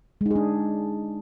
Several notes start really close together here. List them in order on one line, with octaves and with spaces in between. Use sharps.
G#3 D#4 G#4 D4